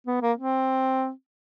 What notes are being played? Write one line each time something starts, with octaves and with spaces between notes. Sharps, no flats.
B3
A#3
C4